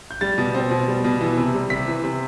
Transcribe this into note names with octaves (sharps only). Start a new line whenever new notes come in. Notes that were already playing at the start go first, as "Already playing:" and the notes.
G6
G3 A6
B2
C4
B2
G3
B2
E3
C3
G3
C3 B6
E3
C3